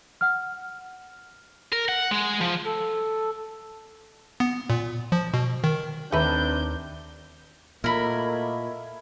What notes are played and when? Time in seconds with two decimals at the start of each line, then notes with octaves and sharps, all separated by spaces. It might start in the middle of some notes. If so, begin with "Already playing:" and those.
0.21 F#5 F6
1.72 A#4
1.89 F#5
2.11 G#3
2.41 F3
2.64 A4
4.40 B3
4.70 A#2
5.12 F3
5.34 B2
5.64 D#3
6.12 D#2 A3 C4 D4 B4 A#5 E6 G6
7.84 A#2 A3 A#3 E4 A#4 D#5 B5